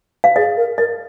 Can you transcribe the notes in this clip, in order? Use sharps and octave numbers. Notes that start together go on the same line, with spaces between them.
F5
G#4 D#5
A#4
A#4 D#5